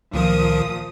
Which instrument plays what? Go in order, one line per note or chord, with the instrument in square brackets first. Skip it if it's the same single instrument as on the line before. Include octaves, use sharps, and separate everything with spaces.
[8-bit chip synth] C#2 D#3 A#4 [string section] A#2 F3 D#6